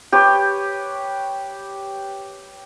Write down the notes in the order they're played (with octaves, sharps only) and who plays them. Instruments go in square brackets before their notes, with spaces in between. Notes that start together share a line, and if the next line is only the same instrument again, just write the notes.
[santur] G4 B4 C#5